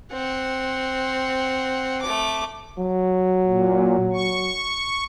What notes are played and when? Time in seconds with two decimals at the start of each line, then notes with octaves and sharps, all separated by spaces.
0.12 C4 F#5
2.02 A3 D6
2.78 F#3
3.45 A#2
4.13 C#6